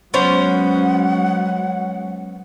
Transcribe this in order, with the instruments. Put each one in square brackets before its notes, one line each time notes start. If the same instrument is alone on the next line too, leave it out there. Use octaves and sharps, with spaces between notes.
[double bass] F#3 G#3 [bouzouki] B3 C#4 C5 [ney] F#5